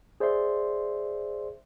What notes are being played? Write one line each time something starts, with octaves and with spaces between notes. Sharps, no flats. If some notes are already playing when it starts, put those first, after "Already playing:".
G#4 C5 D5 E5 C6